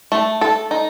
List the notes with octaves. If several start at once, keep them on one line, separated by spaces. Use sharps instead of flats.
A3
A4
D#4